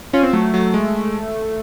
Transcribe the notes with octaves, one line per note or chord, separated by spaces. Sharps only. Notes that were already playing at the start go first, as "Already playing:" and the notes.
C#4 F4
C4
F#3 A3
F#3
G#3